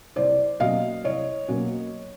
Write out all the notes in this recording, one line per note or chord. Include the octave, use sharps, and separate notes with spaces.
C2 C5 D5
B2 F#3 A#3 C#4 D#5 F5
C2 C#5 D#5
B2 F#3 A#3 C#4